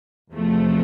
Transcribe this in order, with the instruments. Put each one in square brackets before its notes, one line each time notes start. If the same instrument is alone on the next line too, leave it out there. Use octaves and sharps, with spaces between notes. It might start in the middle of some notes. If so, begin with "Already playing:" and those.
[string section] E2 C3 F3 A3